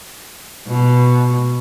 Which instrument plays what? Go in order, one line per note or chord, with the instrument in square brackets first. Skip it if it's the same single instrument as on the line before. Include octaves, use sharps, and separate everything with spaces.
[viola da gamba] B2